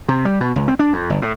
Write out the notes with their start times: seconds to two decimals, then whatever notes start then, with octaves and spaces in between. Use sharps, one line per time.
0.08 C3
0.25 G3
0.40 B2
0.56 C#2
0.68 C4
0.79 D4
0.93 F2
1.10 G1
1.22 A2